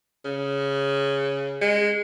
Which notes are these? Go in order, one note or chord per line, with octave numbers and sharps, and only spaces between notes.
C#3
G#3